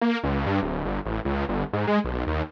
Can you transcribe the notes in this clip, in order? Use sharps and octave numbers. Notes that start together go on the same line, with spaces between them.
A#3
C#2
G2
D1
G1
A1
C#2
G1
G#2
G#3
B1
D#2